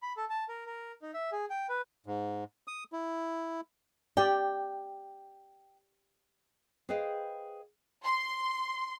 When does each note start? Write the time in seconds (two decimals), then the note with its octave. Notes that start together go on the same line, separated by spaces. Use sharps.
0.02 B5
0.17 A4
0.30 A5
0.49 A#4
0.66 A#4
1.02 D#4
1.14 E5
1.32 G#4
1.50 G5
1.69 B4
2.06 G#2
2.68 D#6
2.93 E4
4.17 G4 D5 G5
6.89 G#4 B4 C5 D#5 F5 G5
8.04 C6